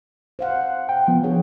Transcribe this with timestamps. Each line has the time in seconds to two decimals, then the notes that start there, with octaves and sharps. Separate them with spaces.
0.39 C5 F5 F#5
0.89 G5
1.08 F3 B3
1.23 D4 G#4 C#5